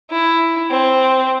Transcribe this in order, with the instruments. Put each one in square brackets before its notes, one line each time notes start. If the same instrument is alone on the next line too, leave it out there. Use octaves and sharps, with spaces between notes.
[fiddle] E4
C4